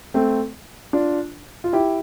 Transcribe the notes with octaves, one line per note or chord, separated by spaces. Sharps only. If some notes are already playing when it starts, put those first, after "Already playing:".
A3 C4
D4 F4
F4
E4 G4